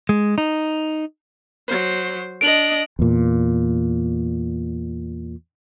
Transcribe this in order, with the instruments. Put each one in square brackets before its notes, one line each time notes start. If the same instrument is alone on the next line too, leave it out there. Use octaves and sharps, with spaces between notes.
[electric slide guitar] G#3
D#4
[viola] F#3 C5
[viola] D4 D#5 [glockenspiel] D7 F7 F#7
[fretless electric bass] E2 A#2